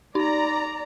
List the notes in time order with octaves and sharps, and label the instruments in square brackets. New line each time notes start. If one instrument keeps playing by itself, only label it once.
[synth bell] D#4 [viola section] D5 A#5